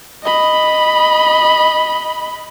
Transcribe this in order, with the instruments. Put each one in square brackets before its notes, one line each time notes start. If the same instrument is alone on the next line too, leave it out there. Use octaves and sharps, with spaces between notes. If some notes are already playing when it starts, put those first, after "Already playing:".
[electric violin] D#5 B5